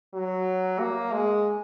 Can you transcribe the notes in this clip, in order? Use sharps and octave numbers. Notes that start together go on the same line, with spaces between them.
F#3
A#3
G#3